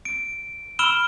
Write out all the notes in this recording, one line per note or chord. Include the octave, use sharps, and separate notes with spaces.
D7
B5 E6 F6 D7 E7 G7